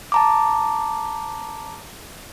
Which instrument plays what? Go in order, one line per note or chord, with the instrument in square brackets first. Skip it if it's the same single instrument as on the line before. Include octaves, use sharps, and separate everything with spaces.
[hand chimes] A5 A#5 D6